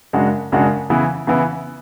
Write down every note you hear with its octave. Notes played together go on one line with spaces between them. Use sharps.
F#2 C#3 G#3 D4 F#4
F#2 C#3 G#3 D4 F#4
C#3 E3 B3 E4
C#3 E3 B3 E4